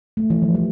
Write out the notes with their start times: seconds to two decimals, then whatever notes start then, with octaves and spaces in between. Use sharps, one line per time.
0.17 A3
0.30 E3
0.42 F3
0.54 G3